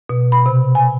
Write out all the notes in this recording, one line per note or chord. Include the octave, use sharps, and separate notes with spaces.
B2
B5
C3
G#5